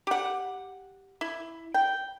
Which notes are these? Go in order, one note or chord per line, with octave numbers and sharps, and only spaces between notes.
G4 F#5
E4
G5